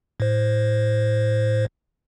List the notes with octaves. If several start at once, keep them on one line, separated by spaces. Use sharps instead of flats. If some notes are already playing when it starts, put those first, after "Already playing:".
A2 C5